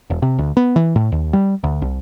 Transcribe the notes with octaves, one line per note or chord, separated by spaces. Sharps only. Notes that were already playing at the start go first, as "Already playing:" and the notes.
E1
C3
D2
B3
E3
A2
D#2
G3
D2
C2